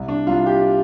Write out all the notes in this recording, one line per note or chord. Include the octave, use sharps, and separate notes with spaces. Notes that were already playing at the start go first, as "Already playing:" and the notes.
Already playing: C2
D4
C2 F4
G4